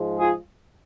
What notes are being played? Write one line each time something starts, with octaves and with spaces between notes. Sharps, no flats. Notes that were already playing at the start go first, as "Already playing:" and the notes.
Already playing: G#2 F3 G#3
F4 G#4